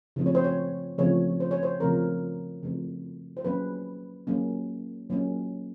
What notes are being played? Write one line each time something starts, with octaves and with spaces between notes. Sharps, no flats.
C#3 F3 A3 C4
C#5
C5
C#5
C#3 F3 A3 C4 C#5
C5
C#5
C5
C#3 F3 A3 C4 A#4
C#3 F3 A3 C4
C5
F#3 A#3 C#4 B4
F#3 A#3 C#4
F#3 A#3 C#4